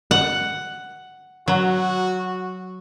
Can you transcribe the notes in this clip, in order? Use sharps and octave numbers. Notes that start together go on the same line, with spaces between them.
F#5
F#3 F#4